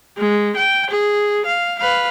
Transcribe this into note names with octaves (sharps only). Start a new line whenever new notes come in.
G#3
G5
G#4
F5
B4 F5